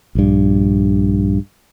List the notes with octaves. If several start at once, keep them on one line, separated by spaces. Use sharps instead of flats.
A#1 G2